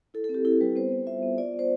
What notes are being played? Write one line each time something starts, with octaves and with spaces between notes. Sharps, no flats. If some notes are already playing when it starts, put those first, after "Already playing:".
E4 A4
A4
C4
G4
E4 A4
G3 B4
B3 C5
B3
F4 E5
B3
F4 D5
B3
C5